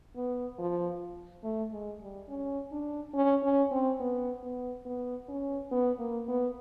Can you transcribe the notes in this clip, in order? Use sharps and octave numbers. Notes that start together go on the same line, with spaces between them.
B3
F3
A3
G#3
G3
C#4
D4
C#4
C#4
C4
B3
B3
B3
C#4
B3
A#3
B3